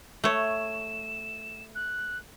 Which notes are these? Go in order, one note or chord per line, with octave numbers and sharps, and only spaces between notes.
A3 C#5 E7
F#6